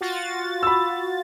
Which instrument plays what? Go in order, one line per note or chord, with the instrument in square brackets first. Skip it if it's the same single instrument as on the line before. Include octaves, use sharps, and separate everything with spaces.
[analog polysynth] F4 F#4 A6
[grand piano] B5 E6